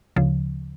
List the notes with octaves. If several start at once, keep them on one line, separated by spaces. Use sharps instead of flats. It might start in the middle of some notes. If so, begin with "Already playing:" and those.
D2 C#3 F3